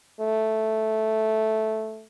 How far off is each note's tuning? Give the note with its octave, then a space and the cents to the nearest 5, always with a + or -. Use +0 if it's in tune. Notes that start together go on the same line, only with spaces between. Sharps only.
A3 -5